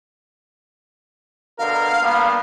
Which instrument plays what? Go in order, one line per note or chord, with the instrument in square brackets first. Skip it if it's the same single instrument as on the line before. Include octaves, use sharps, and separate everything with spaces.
[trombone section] B2 D3 A#4 [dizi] F5
[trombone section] G2 A#3 B3